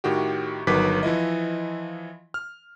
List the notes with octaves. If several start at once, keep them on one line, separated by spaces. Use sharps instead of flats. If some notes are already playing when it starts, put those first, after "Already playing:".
A2 D#3 F#4 G4
G1 D#3 F#3 B4 D6 B6
E3 F3 E4 D#5
F6